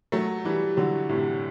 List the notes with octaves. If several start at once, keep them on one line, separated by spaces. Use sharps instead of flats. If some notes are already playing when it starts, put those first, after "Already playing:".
F#3 A3
E3 G3
D3 F#3
A2 C3